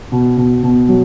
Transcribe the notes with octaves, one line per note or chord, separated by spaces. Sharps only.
B2
B2
B2
F#3